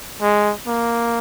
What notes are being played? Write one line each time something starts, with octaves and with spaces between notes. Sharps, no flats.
G#3
A#3